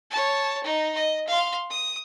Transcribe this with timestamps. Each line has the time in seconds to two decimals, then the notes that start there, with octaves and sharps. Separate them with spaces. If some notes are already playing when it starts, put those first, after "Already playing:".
0.11 C#5 A5
0.63 D#4
0.95 D#5
1.27 F5 C6
1.70 D#6